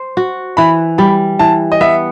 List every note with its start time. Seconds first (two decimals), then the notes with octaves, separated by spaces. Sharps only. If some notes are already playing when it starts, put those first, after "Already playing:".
Already playing: C5
0.17 F#4
0.57 E3 B5
0.98 G3 B5
1.39 E3 A5
1.72 D#5
1.81 B3 E5